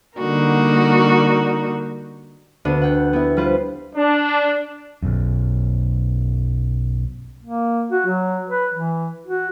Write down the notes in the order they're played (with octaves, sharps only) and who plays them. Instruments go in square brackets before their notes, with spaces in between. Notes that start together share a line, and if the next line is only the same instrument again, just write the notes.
[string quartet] D3 G3 A#3 D#4 F#4 A#4
[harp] D2 B3 D4 D#7
F#5 G5
B3 E4
G3 F4 B4 C5
[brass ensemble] D4
[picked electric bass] B1 F#2
[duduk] A#3
F#4
F#3
B4
E3
F#4